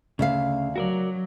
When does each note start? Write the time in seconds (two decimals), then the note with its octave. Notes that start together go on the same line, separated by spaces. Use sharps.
0.19 D2 C#3 E5 F5
0.76 F#3 F#4 A#4 D5